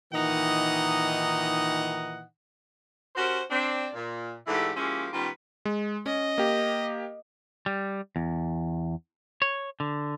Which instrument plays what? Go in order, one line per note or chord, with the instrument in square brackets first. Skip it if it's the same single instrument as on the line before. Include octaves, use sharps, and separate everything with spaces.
[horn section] A#2 D#3 E3 D#4 D#5 F#5
[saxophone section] C#4 F#4 G4 A#4 C5
C4 D4
A#2
G#2 E3 A3 D4 E4 G4
F3 G#3 A#3 C#4 E4 G4
D#3 G3 B3 C#4 F4 B4
[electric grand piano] G#3
[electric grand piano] C#4 [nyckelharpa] D#5
[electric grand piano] A#3 G4
[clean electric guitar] G3
E2
C#5
D3